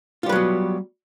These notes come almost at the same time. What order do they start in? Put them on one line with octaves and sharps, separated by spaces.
F4 G3 B4 F#3 B3